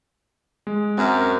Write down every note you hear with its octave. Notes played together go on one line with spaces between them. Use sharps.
G#3
F#2 C4 A#4